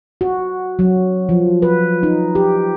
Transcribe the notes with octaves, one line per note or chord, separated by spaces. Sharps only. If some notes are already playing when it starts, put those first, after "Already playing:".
F#4
F#3
F3
B4
D#4
G4